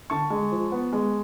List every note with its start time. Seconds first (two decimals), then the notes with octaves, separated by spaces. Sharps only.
0.10 D3 A5 C#6
0.30 G#3
0.52 F3
0.72 B3
0.93 G#3